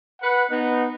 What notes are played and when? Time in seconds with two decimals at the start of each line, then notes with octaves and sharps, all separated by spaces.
0.21 B4 F#5
0.51 B3 D#4